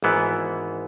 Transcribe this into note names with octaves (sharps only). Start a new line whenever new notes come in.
G#1 G#2 E3 B3